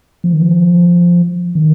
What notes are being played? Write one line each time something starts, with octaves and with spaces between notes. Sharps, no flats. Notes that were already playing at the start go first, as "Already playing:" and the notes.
F3
D#3
F3
D#3